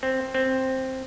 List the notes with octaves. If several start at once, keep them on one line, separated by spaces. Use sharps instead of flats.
C4
C4